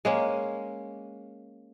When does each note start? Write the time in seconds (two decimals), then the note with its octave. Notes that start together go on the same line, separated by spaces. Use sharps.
0.05 G#3 A#3 C#4